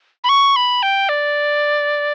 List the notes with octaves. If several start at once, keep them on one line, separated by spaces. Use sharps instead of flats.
B5
C#6
B5
G5
D5